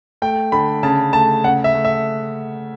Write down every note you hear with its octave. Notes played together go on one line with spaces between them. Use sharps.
A3 G5
D3 B5
C#3 A5
A3 A5
C#3 F#5
E5
A3
E5